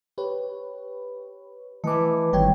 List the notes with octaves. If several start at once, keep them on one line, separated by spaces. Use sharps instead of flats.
G4 B4 C#5
E3 A3 B4 D#5 D6
G#1 G3 C#5 G5 G#6